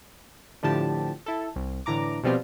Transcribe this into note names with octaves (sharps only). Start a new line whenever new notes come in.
A2 D3 F3 G4 A5
E4 A4
C2
A2 D3 E3 A#5 D6
B2 F3 G3 B3 C4 F4